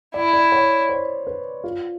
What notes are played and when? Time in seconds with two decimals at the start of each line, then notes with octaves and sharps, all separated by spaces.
0.14 E4 D5
0.33 D5
0.52 C#5
0.89 C5
1.27 B4
1.64 F4